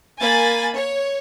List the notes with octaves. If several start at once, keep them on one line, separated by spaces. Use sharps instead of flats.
A#3 G#5 B5 A6
C#5